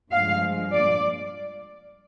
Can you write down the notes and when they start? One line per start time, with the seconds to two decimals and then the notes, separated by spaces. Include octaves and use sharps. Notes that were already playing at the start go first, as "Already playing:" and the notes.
0.11 G2 F3 G#3 F5
0.72 D5